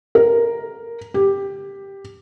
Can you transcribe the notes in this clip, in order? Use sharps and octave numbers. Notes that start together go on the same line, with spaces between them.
A#4
G4